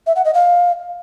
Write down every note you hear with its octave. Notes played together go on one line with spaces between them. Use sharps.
E5
F#5
D#5
F5